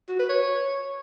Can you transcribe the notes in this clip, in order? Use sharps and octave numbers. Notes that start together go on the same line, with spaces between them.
F#4
B4
C#5